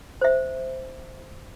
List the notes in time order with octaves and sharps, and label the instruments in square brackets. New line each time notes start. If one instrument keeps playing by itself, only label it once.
[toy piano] C5 E5